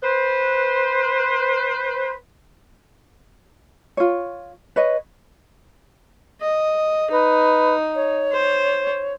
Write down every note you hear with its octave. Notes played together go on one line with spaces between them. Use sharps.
B4 C5
F4 C#5
B4 C#5 D#5
D#5
D#4 B4
C#5
C5